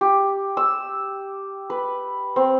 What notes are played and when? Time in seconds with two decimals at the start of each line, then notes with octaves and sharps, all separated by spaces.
0.01 G4
0.57 E6
1.70 B4
2.36 C4